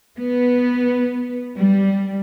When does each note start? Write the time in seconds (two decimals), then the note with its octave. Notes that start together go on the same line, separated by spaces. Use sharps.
0.18 B3
1.58 G3